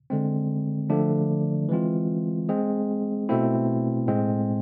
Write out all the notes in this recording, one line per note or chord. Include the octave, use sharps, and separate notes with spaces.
D3 G#3 C4
D3 F3 A3 D4
E3 G#3 C4 F4
G#3 C4 G#4
B2 A3 C4 E4
A2 G#3 C4